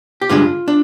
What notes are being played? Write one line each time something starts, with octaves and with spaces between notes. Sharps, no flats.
G4
G2 D3 G#3 D4 F4
D4